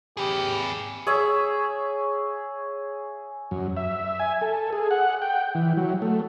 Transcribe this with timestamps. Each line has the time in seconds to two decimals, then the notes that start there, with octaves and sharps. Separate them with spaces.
0.17 G4 G#4 B4
1.07 G#4 C#5 E5
3.51 F#2
3.77 E5
4.20 G#5
4.41 A4
4.73 G#4
4.91 F#5
5.22 G5
5.55 E3
5.77 F#3
6.02 A3